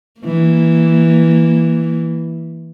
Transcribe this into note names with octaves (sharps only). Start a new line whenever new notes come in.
E3 A#3